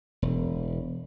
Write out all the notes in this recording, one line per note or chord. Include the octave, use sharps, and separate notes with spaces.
E1